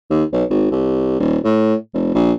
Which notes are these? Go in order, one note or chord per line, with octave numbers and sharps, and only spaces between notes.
D#2
B1
G#1
C2
D#1
A2
F1
A#1